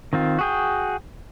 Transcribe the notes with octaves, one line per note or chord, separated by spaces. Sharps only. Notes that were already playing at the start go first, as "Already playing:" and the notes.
D#3 C4 F4
F#4 G#4 G5